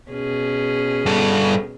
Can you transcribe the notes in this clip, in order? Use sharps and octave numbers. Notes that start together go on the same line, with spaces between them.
B2 C#4 G#4
G2 A4